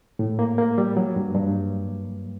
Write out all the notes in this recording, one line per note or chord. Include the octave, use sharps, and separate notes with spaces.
A2
A#3
A#3
G3
F#3
G2
G2